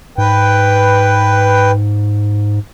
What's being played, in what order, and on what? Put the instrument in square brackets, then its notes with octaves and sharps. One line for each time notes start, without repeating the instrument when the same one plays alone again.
[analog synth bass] G#2 [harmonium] B4 G5